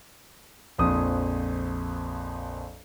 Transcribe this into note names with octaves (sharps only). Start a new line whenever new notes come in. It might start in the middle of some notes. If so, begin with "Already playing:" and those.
A#1 F2 D#6